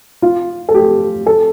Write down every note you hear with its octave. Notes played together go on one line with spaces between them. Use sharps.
F4
A4
G4
A4